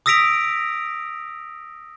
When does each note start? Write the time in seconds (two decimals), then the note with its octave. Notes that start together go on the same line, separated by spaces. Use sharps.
0.06 D#6 E6 A#6 B6 D7 F7